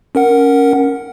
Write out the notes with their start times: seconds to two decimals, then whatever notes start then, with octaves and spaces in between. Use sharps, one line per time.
0.15 C#4 A#4 F#5